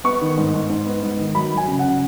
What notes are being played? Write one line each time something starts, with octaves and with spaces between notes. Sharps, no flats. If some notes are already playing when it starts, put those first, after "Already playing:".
B3 C#6
D#3
G#2
G#2
G#2
B3
G#2
D#3
F#3 B5
F#3
G#5
C#3
F#5
C#3